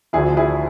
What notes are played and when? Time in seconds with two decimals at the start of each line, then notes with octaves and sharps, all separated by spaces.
0.13 D2 D3 F3 E4 G#4
0.37 E4 G#4